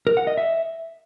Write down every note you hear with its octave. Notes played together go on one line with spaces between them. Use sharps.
A#4
F#5
D#5
E5